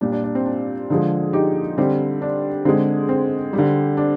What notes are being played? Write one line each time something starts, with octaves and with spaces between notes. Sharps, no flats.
A#2 G3 D4
D4
D4
C4
D4
D3 F3 G#3
D#4 G4
D3 G3 C4
D4
D3 G#3 C4
C4
G3
D3
D4